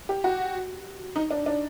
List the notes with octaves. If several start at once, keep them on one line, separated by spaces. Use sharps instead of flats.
G4
F#4
D#4
D4
D4